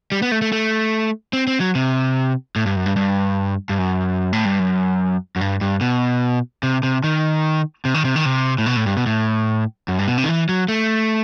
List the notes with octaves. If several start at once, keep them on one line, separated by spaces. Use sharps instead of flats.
G3
B3
A3
A3
A3
C4
C4
F#3
C3
A2
G2
F#2
G2
G2
G2
F#2
A2
G2
F#2
F#2
G2
G2
B2
C3
C3
D#3
C3
D#3
C3
D#3
C3
A2
B2
A2
G2
B2
A2
F#2
G2
B2
C3
D#3
E3
F#3
A3